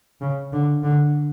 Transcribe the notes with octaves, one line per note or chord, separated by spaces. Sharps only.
C#3
D3
D3